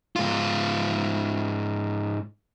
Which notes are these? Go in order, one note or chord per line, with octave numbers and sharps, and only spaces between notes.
G#2 F4